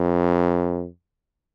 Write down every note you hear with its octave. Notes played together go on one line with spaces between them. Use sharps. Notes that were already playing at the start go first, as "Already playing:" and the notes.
Already playing: F2